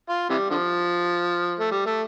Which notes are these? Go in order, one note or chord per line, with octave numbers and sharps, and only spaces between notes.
F4
C3 E3 G3
D3 F3
A3
G3
A3